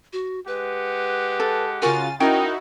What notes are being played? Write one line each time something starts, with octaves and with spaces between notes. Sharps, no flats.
F#4
G#3 G4 B4 F#5
A4
C#3 F4 F#4 A#4 G#5 A6
C#4 D#4 E4 F#4 A#4 G5